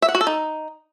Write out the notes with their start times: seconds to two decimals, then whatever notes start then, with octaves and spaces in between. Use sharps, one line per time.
0.02 E5
0.08 F#5
0.15 F#4
0.21 A4
0.27 D#4